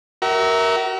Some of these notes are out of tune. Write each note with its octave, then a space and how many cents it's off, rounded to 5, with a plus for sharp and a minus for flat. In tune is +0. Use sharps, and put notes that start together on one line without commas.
F#4 +40 A#4 +0 E5 -15